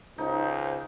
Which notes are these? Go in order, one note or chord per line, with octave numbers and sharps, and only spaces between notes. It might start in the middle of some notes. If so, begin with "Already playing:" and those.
C#2 D#4 C5